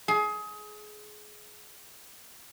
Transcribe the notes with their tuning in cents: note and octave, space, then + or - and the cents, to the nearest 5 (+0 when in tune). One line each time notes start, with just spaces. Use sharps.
G#4 +25